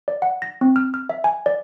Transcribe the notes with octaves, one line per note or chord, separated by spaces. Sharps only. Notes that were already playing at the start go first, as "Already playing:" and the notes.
D5
F#5
A#6
C4
F6
F6
E5
G#5
D5